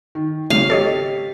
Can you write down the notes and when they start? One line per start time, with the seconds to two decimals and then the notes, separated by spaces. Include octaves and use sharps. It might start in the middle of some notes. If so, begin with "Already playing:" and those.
0.15 D#3
0.50 G#1 G#2 C#3 F5
0.70 G4 A4 C#5 D#5